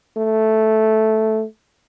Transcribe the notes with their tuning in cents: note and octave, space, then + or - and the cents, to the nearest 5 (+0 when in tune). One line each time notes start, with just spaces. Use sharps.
A3 -5